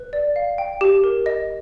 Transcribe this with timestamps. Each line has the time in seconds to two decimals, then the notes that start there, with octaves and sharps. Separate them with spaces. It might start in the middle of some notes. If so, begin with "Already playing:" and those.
Already playing: B4
0.13 D5
0.36 F5
0.58 G5
0.81 G4
1.04 A#4
1.26 D#5